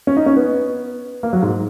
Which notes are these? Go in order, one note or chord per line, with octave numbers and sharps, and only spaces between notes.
C#4
D#4
C#4
B3
A#3
F#3
G#2